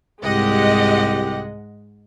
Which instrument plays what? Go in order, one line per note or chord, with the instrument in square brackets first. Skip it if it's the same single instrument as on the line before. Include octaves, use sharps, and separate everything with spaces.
[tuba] C2 [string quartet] G#2 G#3 [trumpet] G4 [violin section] D#5 F#5